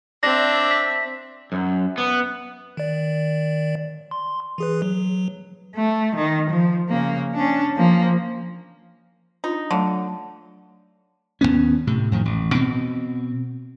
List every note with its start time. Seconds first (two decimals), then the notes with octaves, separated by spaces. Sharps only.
0.23 C4 D4 E5 A#6
0.71 B6
1.52 F#2
1.98 B3
2.77 D#3 D5
4.11 C6
4.58 E3 G#4 B4
4.82 F#3
5.76 A3
6.16 D#3
6.50 F3
6.89 C#3 A#3
7.34 C#4 D4
7.77 F3 A#3
9.44 D4 D#4 F4
9.71 D3 F#3 A3
11.41 D#2 G#2 B3 C#4
11.87 A2 C3
12.12 F2 A2 D#3
12.25 A1
12.54 B2 C4